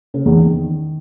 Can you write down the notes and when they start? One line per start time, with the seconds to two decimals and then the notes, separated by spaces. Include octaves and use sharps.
0.14 C#3
0.26 E2 E3
0.37 D#3